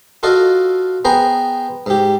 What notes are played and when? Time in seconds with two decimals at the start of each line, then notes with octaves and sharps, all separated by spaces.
0.23 F4 F#4 A4 D#5 F5
1.05 B3 G#4 C5 G5 G#5 A#5
1.86 G#2 G4